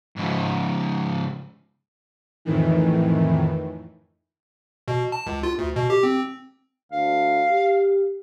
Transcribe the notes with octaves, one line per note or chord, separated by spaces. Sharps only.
G#2 C#3
F2 A2 D#3 E3
B2
A5
C#2
F4
D2
B2
G4
C4
D2 F5
G4